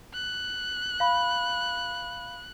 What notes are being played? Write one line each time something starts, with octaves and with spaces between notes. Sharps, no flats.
F#6
F5 B5